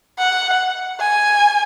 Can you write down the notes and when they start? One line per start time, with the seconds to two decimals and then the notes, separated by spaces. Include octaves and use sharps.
0.19 F#5
1.00 G#5